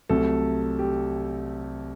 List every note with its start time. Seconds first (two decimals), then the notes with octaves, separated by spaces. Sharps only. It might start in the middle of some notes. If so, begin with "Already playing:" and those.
0.09 C2 C3 F#3 A3 A4
0.79 G4